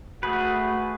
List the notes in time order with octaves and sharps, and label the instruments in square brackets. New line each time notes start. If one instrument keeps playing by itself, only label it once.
[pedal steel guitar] A3 G#4 B4 [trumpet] F#4